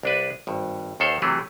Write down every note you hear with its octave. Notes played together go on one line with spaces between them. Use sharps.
C2 D4 B4
G#1 G2
D#2 D#3 A4 C5 C#5
C3 E3 F#3 A3 G4 G#4